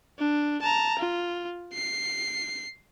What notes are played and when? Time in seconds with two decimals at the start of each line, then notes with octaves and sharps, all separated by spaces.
0.19 D4
0.62 A5 A#5
0.99 F4
1.74 C7